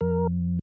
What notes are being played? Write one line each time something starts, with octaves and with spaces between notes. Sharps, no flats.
F2 A#4